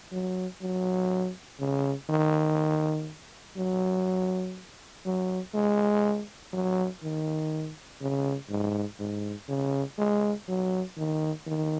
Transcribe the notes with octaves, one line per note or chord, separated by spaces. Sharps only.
F#3
F#3
C#3
D#3
F#3
F#3
G#3
F#3
D#3
C#3
G#2
G#2
C#3
G#3
F#3
D#3
D#3